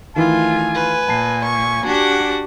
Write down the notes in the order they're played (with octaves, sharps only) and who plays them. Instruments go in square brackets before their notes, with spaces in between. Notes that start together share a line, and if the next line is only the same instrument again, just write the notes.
[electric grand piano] D#3 E3 E4 [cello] A3 F4 [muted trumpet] G#5
[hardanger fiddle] B4
[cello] A#2 [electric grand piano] A5 C7
[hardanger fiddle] C#6
[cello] D4 G4 [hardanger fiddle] F#4 F#5